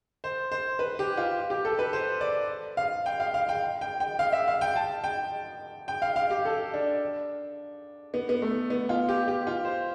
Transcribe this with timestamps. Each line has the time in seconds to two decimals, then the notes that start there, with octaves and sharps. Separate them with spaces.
0.24 C5
0.52 C5
0.79 B4
0.99 G4
1.17 F4
1.50 G4
1.65 A4
1.79 B4
1.93 C5
2.21 D5
2.77 F5
3.06 G5
3.20 F5
3.34 F5
3.49 G5
3.81 G5
4.00 G5
4.19 F5
4.32 E5
4.48 F5
4.61 G5
4.76 A5
5.04 G5
5.88 G5
6.02 F5
6.16 F5
6.30 G4
6.45 A4
6.74 D4
8.14 B3
8.29 B3
8.42 A3
8.70 B3
8.89 F4
9.09 G4
9.28 G4
9.47 F4
9.65 C5